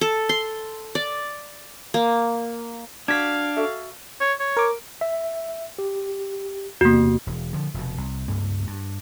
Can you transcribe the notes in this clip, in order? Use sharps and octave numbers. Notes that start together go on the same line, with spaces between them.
A4
C6
D5
A#3
D4 F#4 F5 G#6 B6
F#4 A4 E5
C#5
C#5
A#4 D6
E5
G4
E2 C3 A#3 F#4
E1
D3 F3
F1 B2
C2
C#2 G2 A#3
G2